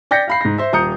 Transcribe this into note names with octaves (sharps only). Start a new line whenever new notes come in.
D5 G5 G6 A#6 B6 C#7
F5 B5 C7
G#2 A#6
C5 E5
D#1 A#5 D#6 G6 C#7